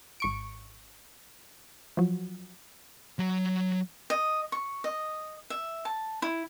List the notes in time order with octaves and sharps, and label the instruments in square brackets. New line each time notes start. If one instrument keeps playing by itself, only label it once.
[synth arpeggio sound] G#1 C#6 D7
F3 F#3
[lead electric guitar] F#3 A#5
[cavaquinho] D#5
C#6
D#5
E5
A5
E4